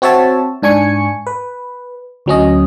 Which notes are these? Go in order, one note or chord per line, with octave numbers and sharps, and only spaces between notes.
C4 F#4 C#5 E5 A5
G#2 D4 G#5 C#6 C#7
B4
D2 F#3 C#4 D#5